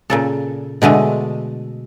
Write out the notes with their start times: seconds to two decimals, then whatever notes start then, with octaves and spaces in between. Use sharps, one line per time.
0.10 A#2 C#3 A4
0.82 B2 D3 G#3 A3